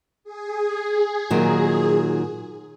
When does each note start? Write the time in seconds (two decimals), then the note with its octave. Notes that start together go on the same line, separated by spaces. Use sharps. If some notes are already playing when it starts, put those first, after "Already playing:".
0.24 G#4
1.31 A#2 D#3 F#3